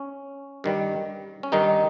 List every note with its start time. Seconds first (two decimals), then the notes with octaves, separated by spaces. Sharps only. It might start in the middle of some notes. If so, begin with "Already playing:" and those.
Already playing: C#4
0.64 G2 D#3 G3
1.43 C#4
1.52 G2 D#3 G3 D#4